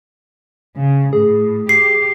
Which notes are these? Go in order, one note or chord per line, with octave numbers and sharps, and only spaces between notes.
C#3
A2 G#4
G4 C7